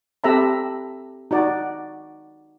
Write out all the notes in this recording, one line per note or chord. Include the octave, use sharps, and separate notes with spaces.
C4 G4 A4 E5 A#5 B5
D#4 F#4 D5